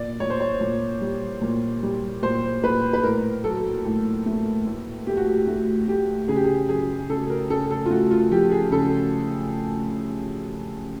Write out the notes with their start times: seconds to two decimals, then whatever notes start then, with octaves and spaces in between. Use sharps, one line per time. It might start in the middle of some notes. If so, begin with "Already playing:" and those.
Already playing: A#2 D5
0.20 A#2 C#5
0.30 C5
0.40 C#5
0.61 A#2
1.01 G3
1.42 A#2
1.83 G3
2.23 A#2 C5
2.63 A#2 B4
2.93 B4
3.03 A2 A#4
3.44 F#3 A4
3.85 A2
4.26 A3
4.66 A2
5.07 A3 G4
5.17 F#4
5.26 G4
5.47 A3 F#4
5.88 A3 G4
6.28 C#3 G#4
6.36 G4
6.44 G#4
6.69 F#2 G#4
7.09 C#3 A4
7.30 A#4
7.50 C#3 A4
7.71 A4
7.86 F4
7.90 A3 F#4
8.11 F4
8.31 F3 G4
8.51 G#4
8.72 C#3 A4